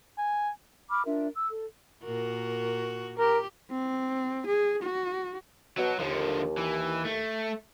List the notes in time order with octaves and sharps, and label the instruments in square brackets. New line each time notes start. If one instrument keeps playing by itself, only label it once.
[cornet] G#5
[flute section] B5 C#6 D6 F6
D4 F4 A#4 E5
E6
A4
[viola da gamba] A#2 F#4 A#4
[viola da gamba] G4 [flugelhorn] A#4
[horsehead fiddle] C4
G#4
F#4
[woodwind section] B2 [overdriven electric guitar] F#3
[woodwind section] D#2 [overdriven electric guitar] D3 F3
[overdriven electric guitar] E3
A3